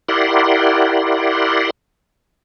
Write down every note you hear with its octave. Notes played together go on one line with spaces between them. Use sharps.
E4 G4 A#4 D5 F#5 C6